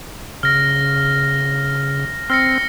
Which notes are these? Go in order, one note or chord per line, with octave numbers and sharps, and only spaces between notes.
C#3 F6 A#6
C4 F6 A#6 C#7